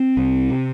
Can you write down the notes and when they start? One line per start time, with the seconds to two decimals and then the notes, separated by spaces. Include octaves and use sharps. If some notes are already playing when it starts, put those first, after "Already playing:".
Already playing: C4
0.17 C2
0.50 C3